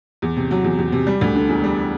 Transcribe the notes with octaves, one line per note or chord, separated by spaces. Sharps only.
E2
C3
F#3
E2
E2
C3
G3
D2
D3
E1
G3